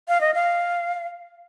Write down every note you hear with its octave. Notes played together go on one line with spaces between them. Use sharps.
F5
D#5
F5